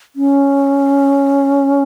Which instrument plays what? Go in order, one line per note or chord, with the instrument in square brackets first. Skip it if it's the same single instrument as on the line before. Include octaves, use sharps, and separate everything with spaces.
[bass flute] C#4